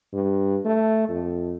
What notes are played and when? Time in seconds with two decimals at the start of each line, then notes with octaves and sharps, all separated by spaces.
0.13 G2
0.65 A3
1.09 F2